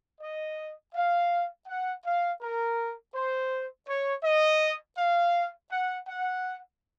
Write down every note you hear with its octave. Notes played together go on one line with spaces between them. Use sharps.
D#5
F5
F#5
F5
A#4
C5
C#5
D#5
F5
F#5
F#5